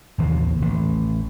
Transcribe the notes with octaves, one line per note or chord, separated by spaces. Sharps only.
A1 D#2 A2 C3
A1